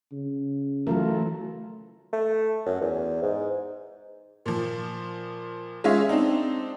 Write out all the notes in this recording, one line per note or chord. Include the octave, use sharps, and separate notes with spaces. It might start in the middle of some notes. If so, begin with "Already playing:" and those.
C#3
E3 F#3 A3 F4 A#4
A3
F#2
E2
G#2
A#2 F3
G#3 C#4 F4 G#4 C#5 E5
C4 D4 D#4